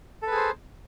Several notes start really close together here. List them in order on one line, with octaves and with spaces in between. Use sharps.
A4 B4 G#4 C5